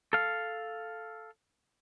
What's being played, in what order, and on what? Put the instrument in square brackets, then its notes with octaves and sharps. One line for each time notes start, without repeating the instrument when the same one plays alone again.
[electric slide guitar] A4 F5